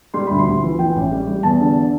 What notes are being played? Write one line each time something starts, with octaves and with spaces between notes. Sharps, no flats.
G3 C6
D2 B5
C6
D2
E3
E3 G5
A1
G3
G3
E2 A5
D3